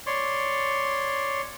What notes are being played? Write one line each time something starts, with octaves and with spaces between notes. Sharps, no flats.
C#5 D5 C6